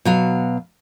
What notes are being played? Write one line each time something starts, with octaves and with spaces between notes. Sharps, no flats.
B2 F#3 F5